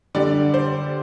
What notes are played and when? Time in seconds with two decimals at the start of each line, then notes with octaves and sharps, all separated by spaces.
0.15 D3 G3 D5
0.54 C5